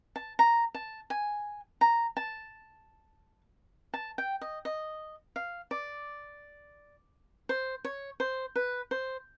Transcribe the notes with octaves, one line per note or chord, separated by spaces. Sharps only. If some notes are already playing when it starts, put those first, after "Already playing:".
A5
A#5
A5
G#5
A#5
A5
A5
G5
D#5
D#5
F5
D5
C5
C#5
C5
B4
C5